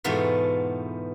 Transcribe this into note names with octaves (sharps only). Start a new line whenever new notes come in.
E2 G#2 B2 A3 B3 F4